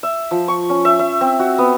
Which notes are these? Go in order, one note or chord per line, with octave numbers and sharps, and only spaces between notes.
E5
F3
C#6
C#4
E5
E5
C4
F#4
B3